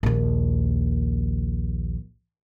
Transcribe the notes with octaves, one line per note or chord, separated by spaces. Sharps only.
A#1 D#2